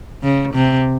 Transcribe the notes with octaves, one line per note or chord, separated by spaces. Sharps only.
C#3
C3